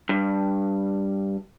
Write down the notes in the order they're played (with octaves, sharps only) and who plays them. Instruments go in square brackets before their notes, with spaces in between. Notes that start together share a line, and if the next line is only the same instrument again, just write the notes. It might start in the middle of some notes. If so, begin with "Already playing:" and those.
[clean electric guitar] G2